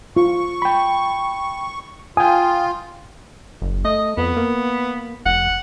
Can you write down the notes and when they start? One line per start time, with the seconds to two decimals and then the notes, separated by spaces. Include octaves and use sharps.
0.17 F4 C#6
0.62 G5 B5
2.17 F4 G5 G#5 D#6
3.62 F#1
3.85 A3 D#5
4.17 F2 B3
4.37 A#3
5.26 F1 F#5